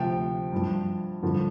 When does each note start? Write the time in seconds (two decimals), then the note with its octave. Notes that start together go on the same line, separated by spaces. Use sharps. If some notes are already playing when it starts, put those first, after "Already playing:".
Already playing: D2 C3 F3 G5
0.52 G2 F3
1.22 G2 D3 F3